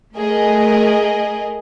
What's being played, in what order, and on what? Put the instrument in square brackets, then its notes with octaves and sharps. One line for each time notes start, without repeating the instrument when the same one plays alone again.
[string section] A3 G#4 A#4 D#5